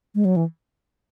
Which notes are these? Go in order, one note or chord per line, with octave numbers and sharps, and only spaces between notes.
G#3
F#3
E3